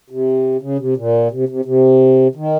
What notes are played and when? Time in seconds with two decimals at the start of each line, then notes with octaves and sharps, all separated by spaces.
0.10 C3
0.62 C#3
0.79 C3
0.97 A#2
1.31 C3
1.49 C3
1.65 C3
2.35 D#3